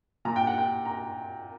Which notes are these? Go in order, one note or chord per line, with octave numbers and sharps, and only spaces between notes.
A#2 A#5
G5
F#5
G5
A#5